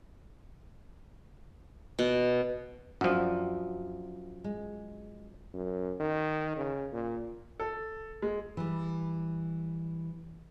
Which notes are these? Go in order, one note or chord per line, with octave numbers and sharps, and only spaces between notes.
B2
F#2 F3 D4 F#4
G#3
F#2
D#3
C#3
A#2
A4
G#3
E3 G3